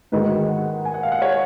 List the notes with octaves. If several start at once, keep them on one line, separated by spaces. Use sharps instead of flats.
G#2 D#3 G#3 D#4 F#4 B4
F#5
G#5
F#5
F5
F#5
C#5